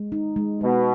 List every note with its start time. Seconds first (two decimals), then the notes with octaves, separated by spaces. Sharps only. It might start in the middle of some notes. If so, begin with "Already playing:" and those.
Already playing: G#3
0.12 D#4
0.36 G#3
0.61 B2 G#3